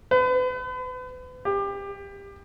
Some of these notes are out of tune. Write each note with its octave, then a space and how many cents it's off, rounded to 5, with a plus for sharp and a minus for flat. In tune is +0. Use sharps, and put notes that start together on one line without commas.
B4 +40
G4 +25